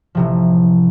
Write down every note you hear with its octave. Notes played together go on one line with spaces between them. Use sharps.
A1 C3 F3